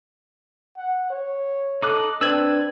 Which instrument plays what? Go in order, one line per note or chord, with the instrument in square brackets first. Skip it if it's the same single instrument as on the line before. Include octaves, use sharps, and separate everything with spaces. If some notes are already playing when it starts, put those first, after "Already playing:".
[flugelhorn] F#5
C#5
[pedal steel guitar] D#4 D6 F#6 [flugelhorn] A4
[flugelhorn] C4 [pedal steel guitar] D4 B4 D5 [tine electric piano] E6 G#6